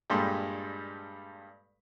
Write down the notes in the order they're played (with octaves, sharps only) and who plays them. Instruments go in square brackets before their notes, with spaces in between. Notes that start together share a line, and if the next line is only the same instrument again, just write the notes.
[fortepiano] G2 A#2 G3 G#3 A4 C6